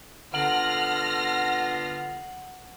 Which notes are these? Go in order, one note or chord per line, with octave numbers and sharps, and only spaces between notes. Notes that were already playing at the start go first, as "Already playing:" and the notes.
D3 B3 D4 F4 F#5 F6 A#6 F#7